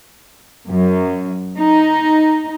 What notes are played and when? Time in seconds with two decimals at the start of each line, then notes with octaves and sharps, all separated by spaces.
0.69 F#2
1.59 D#4